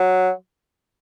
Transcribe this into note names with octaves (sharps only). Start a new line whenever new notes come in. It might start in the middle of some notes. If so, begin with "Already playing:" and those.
Already playing: F#3